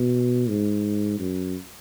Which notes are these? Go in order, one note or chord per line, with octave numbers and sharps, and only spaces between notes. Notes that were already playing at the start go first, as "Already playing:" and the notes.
Already playing: B2
G#2
F#2